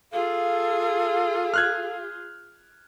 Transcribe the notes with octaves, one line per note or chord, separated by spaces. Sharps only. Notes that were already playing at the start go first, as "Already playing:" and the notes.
F4 G#4 A4 F5
F6 F#6 G#6